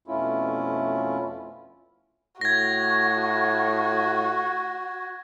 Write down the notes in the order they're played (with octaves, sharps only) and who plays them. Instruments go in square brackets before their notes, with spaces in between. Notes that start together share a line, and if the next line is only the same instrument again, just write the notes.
[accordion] F2 B2 A3 C#4 E4 F4
[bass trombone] A2 [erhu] F#4 [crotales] G#6 A#6